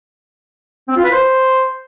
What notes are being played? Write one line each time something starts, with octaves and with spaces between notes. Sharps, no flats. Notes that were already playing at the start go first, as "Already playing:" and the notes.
C4
F4
B4
C5